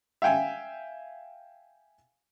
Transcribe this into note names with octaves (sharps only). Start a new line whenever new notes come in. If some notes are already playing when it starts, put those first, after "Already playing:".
E5 F5 G5 G#5